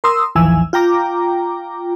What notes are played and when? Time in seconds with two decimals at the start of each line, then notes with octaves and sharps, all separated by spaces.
0.04 A#4 C6 D#6 E6
0.35 A1 D#2 E3 F3 G#5 E6
0.73 F4 G5 A#5 D6